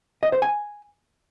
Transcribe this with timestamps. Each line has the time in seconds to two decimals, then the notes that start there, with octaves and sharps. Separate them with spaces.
0.23 D#5
0.32 C5
0.42 G#5